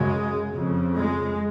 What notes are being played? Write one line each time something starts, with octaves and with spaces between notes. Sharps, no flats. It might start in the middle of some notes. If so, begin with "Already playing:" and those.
Already playing: F#2 C#3 G#3
F2 C#3
G#3